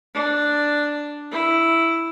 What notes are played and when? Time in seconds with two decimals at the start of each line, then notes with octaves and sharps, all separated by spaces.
0.15 D4
1.32 E4